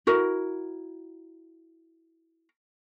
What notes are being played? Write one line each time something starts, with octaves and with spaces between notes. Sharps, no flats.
E4 F#4 A#4